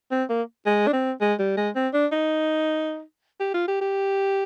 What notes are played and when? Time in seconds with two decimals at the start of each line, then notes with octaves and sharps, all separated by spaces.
0.11 C4
0.29 A#3
0.66 G#3
0.87 D4
0.93 C4
1.21 G#3
1.39 G3
1.57 G#3
1.75 C4
1.94 D4
2.12 D#4
3.40 G4
3.54 F4
3.68 G4
3.81 G4